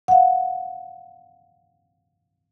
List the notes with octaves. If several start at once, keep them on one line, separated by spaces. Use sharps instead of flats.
F5 F#5